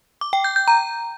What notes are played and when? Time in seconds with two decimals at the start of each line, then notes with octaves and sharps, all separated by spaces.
0.21 D6
0.33 G5
0.44 G6
0.56 G6
0.68 A#5